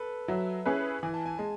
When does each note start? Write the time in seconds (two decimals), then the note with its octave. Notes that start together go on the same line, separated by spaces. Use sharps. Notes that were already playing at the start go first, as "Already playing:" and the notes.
Already playing: A4 B4
0.28 F#3 E5
0.66 C#4 E4 G#4 B4
1.03 E3 G#5
1.14 A5
1.26 G#5
1.37 G#3 A5